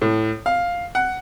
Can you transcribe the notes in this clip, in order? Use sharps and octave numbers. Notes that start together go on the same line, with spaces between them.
A2
F5
F#5